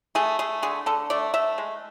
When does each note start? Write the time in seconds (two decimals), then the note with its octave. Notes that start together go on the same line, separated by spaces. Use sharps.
0.15 A3 G#4
0.39 A3 G#4
0.63 D3 G#4
0.86 D3 A4
1.10 A3 D5
1.34 A3 E5
1.58 G#3